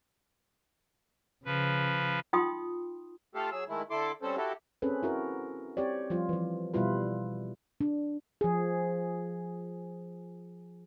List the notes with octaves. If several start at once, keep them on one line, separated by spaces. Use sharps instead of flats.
C#3 F3 B4
D#4 F4 G5 C6 D#6
A3 F4 G4 A4 F5
F#3 G#4 E6
D#3 G#3 A3 E4
D3 E4 A4 C6 D6
G3 C4 C#4 A4 C5
E4 F#4 G4 A4
C4 C#4 G#4 A4 B4
E4 F#4 A#4
C4 G4 C#5 D5
F3 G3 F4
E3 F3
B2 G3 E4 F4 B4
D4
F3 G#4